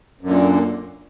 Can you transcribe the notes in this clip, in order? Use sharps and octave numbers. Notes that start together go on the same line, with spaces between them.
F#2 A#2 D3